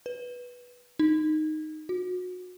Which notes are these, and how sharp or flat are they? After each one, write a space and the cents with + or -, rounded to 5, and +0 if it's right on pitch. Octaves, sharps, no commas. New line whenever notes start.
B4 -10
D#4 -5
F#4 -30